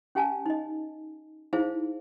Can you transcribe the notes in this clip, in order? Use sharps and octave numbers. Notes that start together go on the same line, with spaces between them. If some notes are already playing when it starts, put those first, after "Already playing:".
C#4 G4 F5 G#5 A5
D#4 D#5
D#4 E4 G#4 C5 F5